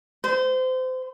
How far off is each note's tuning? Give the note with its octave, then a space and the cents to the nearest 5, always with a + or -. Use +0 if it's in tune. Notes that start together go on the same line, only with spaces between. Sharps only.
C5 -30